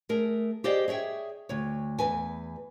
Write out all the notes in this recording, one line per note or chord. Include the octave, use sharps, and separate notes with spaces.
A3 G#4 A#4
G4 G#4 C5 D5 D#5 F5
G#4 C#5 E5 G5
D2 C#5
E2 B4 G#5